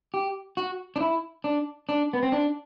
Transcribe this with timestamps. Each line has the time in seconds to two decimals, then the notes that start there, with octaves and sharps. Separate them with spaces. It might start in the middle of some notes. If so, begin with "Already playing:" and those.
0.14 G4
0.57 F#4
0.96 D4
1.01 E4
1.44 D4
1.89 D4
2.13 B3
2.23 C4
2.32 D4